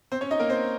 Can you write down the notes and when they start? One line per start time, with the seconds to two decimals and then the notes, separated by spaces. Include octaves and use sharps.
0.12 C4 C5
0.21 C#4 C#5
0.31 D#4 D#5
0.40 A#3 A#4
0.49 C4 C5